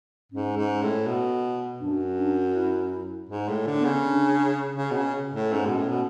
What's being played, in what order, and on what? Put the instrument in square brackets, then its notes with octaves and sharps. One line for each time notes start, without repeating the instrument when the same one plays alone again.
[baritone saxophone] G#2 [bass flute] C#4
[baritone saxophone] G#2
A2
B2
[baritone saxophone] F#2 [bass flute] D4
[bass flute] D4
E4
[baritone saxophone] G#2
A2
D3
[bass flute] B3
[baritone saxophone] C#3
[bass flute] C#4
D4
[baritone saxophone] C#3
B2
C#3
A2
[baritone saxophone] G#2 [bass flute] C#4
[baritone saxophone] B2
A2
B2